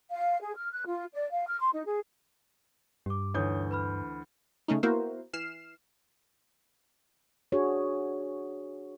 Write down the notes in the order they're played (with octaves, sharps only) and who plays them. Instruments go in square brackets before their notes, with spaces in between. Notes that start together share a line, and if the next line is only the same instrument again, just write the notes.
[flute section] F5
G#4
F6
F#6
F4
D5
F5
F6
C6
D#4
G#4
[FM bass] G2 [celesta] G4 D6
[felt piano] D2 E3 G6 [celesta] D#4 C#5 D#6
[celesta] B4 B5 F6
[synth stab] C#3 A3 C#4 D#4
A#3 B3 E4 F#4 A#4 C5
E3 F6 C7 E7
[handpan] D4 F#4 G#4 C#5